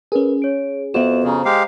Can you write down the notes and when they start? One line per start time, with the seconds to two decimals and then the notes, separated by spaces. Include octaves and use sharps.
0.12 C#4 G#4 A#4 B4
0.42 C#5 D7
0.94 F2 B3 F#4 E5 E7
1.24 C#3 C5 A#5
1.45 G#3 G4 F5